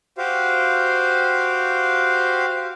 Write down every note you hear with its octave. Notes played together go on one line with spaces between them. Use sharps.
F#4 G4 C5 F5